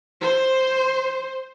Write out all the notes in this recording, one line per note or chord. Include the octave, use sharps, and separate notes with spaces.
C5